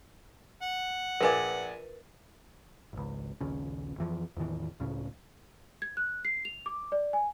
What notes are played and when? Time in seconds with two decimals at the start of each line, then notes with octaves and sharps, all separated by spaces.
0.62 F#5
1.21 A#1 G#4 A#4 B4 D5
2.93 G#1 C#2
3.41 A#1 D#2 C#3
3.98 F2 E3 F3
4.37 E2 A2 D#3 E3
4.80 C#2 A2 C#3
5.82 G#6
5.97 F#6
6.25 C7
6.45 F7
6.66 D6
6.92 D5
7.13 G#5